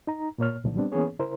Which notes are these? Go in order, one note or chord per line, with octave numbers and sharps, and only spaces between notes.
D#4 A#5
A#2 A#3 C#5 F6
C2 A#2 D3 D#3 F3 F#3
G3 B3 C4 D4
E3 A#3 B3 C#4 G#4 C#5
C#3 E4 A#4 C5